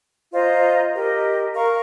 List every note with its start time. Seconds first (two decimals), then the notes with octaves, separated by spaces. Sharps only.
0.32 F4 C5 D#5 A#5
0.93 G4 A#4 D#5
1.54 A#4 F5 A#5 C#6